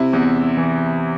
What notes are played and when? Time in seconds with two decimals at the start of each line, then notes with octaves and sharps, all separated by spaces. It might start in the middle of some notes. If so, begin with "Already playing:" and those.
Already playing: C3 E4
0.13 E2
0.57 E3